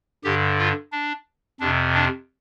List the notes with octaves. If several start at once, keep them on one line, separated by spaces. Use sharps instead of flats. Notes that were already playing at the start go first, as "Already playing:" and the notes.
G2 D3 G4
F4
D4
F2 C3 D4
D4